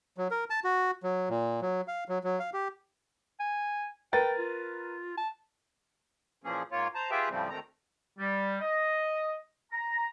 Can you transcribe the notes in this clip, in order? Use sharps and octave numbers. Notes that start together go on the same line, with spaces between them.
F#3
A#4
A5
F#4
F#3
A#2
F#3
F5
F#3
F#3
F5
G4
G#5
A#4 B4 G5 A6
F4
A5
A#2 E3 F3 A#3 C#4 G#4
G#2 A#3 F4 C#5
C5 A5 A#5
F4 G4 G#4 B4 E5 G5
A2 C#3 F3 G3 A3 C4
D2 D#3 A3 C4 A#5
G3
D#5
A#5